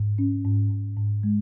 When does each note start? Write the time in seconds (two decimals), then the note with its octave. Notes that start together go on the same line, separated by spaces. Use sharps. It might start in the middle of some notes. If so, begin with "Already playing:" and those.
Already playing: G#2
0.18 C#4
0.45 G#2
0.70 G#2
0.98 G#2
1.23 G#3